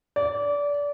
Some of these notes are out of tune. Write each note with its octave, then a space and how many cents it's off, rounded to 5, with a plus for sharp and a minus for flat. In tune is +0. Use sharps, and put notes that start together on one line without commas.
D5 -25